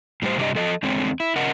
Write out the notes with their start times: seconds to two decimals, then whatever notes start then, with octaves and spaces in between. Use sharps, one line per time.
0.22 A2 G3 F#4 C5
0.37 G2 C3 G3 D4 G4 D#5
0.55 F3 A4 D#5
0.83 E2 D3 G#3 C4 C#5
1.20 E4
1.36 C#3 A#4 D#5 F#5